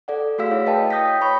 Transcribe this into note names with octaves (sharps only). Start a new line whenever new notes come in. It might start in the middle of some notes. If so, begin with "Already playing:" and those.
A4 D5 F#5
A3 F#4 G#4 F5 E6 B6
E4 C#5
B4 D#5 G5 A5
G5 D#6 G6 A#6 B6
C#5 B5 C#6